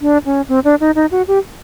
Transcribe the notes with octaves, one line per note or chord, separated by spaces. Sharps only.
D4
C#4
C4
D4
D#4
D#4
F#4
G4